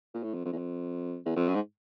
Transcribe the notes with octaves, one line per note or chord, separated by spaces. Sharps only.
A#2
A2
F2
F2
E2
F2
E2
F2
F#2
G#2